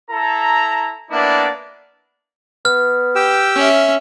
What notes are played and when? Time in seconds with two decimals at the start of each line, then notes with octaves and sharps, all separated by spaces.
0.11 E4 A4 A#5
1.11 A#3 B3 D4 E4 D5
2.65 B3 F6
3.15 G4 G5 E6
3.55 C#4 E5